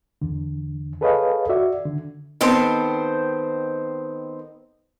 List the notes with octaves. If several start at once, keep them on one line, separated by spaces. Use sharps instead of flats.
E2 D3
G#4 A4 B4 C#5 D#5 F5
F#4 D5 E5
D3
D#3 B3 C4 A4 C5